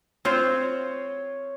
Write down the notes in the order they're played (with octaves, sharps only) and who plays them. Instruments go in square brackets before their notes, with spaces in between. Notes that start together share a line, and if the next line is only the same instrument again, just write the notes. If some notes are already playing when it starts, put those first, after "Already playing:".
[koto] C4 F4 C5 [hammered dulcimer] C#5